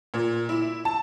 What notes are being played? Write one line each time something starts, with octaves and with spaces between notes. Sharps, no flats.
A#2
E4
A5